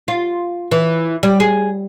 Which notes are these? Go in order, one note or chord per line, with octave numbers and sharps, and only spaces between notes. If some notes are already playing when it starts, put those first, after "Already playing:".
F4
E3
G3
G#4